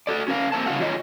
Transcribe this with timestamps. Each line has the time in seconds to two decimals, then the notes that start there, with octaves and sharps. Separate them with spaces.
0.07 F#4 A4 D5
0.28 C#4 A#4 F5
0.52 A#3 C4 A5
0.66 G2 C#3 D4 F#4 F5 F#5
0.80 D#3 F#3 F4 C#5 D#5